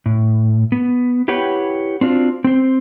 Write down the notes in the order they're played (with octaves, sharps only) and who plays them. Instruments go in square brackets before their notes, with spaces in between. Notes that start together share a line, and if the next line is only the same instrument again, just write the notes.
[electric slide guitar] A2
B3
E4 G4 B4 C#5 F#5 G5
C4 D4 F4 F#4 C5
C4 C5